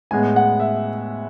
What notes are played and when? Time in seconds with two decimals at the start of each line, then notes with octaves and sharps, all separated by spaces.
0.11 A2 G#3 B3 G#5
0.36 F#5
0.60 E5